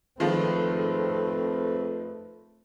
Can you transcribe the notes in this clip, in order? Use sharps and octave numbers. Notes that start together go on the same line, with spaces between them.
F2 D#3 F3 G#3 A3 C4 B4